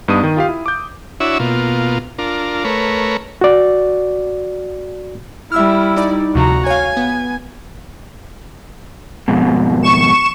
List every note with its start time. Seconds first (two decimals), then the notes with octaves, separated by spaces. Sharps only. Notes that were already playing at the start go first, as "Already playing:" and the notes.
0.08 G2 B3 D4 D#4 D#6 D#7
0.23 D#3
0.37 F4 G4 F5
0.49 E4
0.66 D6 G6
1.20 D4 E4 F#4 C#5 E5
1.39 B2 A#3 F4
2.18 D4 F4 A#4
2.65 A3 A#4 B4 C#5
3.41 F#4 D5
5.52 G3 E4 E5 E6 F6
5.96 D#4 D5
6.35 D2 C3 F3 F#4 A#5
6.66 C#5 F5 G#5
6.97 B3
9.28 F2 G#2 B2
9.82 C#6 E7